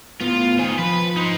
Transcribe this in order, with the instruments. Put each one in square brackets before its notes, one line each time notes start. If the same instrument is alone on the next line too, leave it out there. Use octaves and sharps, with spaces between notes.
[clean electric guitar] A2 B3 [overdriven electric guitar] F4
[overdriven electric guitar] D#3 [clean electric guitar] C5 G#5
[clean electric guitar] F3 [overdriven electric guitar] B4
[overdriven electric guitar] D#4 C5